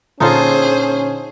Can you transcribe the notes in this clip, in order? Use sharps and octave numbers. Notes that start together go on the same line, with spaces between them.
A#2 D3 C#4 D#4 F4 G#4 A4 C5